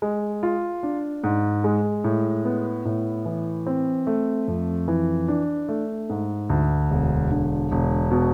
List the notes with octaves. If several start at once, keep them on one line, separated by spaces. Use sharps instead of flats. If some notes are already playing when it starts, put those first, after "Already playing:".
G#3
F4
D4
G#2
G#3
A2
B3
A2
E3
C4
A3
F2
E3
D4
A3
G#2
D2
E1
D3
E1
B2